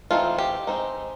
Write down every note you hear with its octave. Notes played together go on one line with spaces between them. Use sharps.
E3 A3 C4 D#4 F4
G4
G#3 C4 D#4